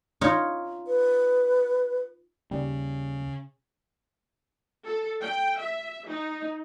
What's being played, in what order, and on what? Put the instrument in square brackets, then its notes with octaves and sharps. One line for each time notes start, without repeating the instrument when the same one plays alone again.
[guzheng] D#4 F4 C#5
[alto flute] B4
[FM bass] D#2 [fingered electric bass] C#3 [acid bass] G3
[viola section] A4
G5
E5
D#4